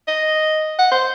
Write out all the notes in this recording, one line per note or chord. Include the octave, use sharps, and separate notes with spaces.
D#5
F#5
C5